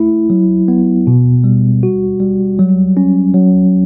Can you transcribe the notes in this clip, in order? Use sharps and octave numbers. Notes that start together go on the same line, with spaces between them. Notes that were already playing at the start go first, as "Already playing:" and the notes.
Already playing: A3 E4
F#3
B3
B2
G3
F#4
G3
F#3
C#4
F#3